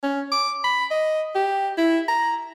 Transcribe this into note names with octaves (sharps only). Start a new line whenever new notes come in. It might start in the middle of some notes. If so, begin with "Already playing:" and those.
C#4
D6
B5
D#5
G4
E4
A#5